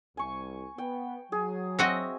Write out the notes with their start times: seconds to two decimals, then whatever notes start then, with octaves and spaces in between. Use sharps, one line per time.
0.17 C2 G#5 C#6
0.78 B3 G5
1.32 F#3 G#4
1.79 C4 F#4 D#5 E5